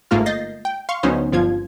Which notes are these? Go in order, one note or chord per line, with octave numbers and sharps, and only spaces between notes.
G1 G#2 A3 A#3 F4 F6
D#5 G6 A6 A#6 C7
G5
F5 C6 C#6
D2 F#3 B3 C#4 D#4 C5
G1 F3 F4 G#6